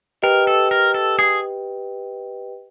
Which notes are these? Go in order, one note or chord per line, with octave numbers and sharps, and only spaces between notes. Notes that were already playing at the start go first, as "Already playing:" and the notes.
G4 A#4 B4 D#5 G5
A4
A#4
A4
G#4